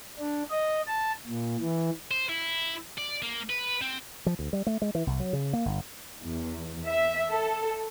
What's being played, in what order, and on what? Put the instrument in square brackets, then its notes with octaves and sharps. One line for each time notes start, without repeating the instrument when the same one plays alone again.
[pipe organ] D4
D#5
A5
A#2
E3
[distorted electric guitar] C5
E4
D5
A#3
B4
C4
[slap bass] F3
D2
G3
A3
G#3
E3
C2
F#3
C#3
A#3
G1
[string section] E2
E5
A4